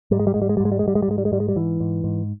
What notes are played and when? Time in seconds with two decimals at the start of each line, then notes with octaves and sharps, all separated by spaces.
0.11 G#2 G3
0.19 G#3
0.27 G3
0.34 G#2 G#3
0.42 G3
0.49 G#3
0.57 G3
0.60 G#2
0.65 G#3
0.72 G3
0.79 G#3
0.84 G#2 G3
0.95 G#3
1.02 G3
1.08 G#2 G#3
1.18 G3
1.25 G#3
1.32 G#2 G3
1.40 G#3
1.48 G3
1.56 G#2 E3
1.80 G#2
2.04 G#2